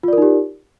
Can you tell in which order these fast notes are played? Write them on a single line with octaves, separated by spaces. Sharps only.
F4 D5 A#4 D#4 G4